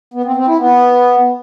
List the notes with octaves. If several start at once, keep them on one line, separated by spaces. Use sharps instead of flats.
B3
C4
C4
E4
B3